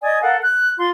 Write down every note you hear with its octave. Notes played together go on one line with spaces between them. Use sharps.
D5 D#5 G#5 D#6
A4 A#4 F5 F#5
F#6
F4 C6